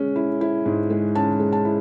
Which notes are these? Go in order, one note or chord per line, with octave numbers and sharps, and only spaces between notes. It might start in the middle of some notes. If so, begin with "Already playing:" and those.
Already playing: G#3 C#4
E4
E4
G#2
G#3
C#4 A5
G#3
A5
E4